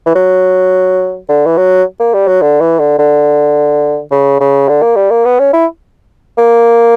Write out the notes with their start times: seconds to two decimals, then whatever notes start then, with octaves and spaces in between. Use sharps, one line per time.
0.06 E3
0.15 F#3
1.29 D3
1.46 E3
1.57 F#3
2.00 A#3
2.14 G3
2.27 F#3
2.42 D3
2.61 E3
2.79 D3
2.99 D3
4.11 C#3
4.40 C#3
4.69 D3
4.82 A#3
4.96 G3
5.11 A#3
5.25 B3
5.39 C#4
5.53 E4
6.38 A#3